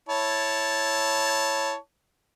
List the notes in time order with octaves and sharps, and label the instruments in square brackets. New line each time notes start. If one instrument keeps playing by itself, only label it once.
[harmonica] E4 C#5 A5